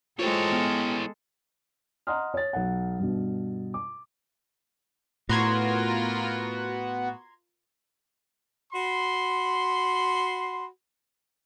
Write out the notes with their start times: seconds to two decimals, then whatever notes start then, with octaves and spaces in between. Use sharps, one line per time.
0.19 E3 G#3 F4 A4 C5 C#5 G5
0.52 B3 G5 F6
2.07 D#5 F#5 A#5 C6 D#6 F6
2.34 C#5 A6
2.53 B1 F#5
2.99 G2 B2
3.74 D6
5.29 A2 B3 F4 F#4 A#4 A#5 C6 G#6
8.72 F#4 B5 C6